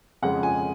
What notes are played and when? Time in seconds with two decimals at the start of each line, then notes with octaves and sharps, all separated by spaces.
0.22 F2 C#3 G#3 F#5
0.43 G#5